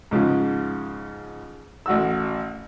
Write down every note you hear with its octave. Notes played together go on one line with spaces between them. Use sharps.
G#2 C#3 F3
A1 F#4 E6